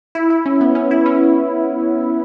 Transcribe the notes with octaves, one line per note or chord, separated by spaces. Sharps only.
E4
E4
C#4
B3
C#4
E4
C#4